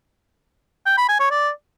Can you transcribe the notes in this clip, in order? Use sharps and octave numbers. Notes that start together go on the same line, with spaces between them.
G5
B5
G#5
C#5
D5